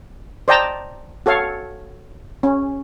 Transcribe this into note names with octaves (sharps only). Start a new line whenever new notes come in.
C5 D5 D#5 G5 A5 A#5
F#4 A4 C#5 F5
C#4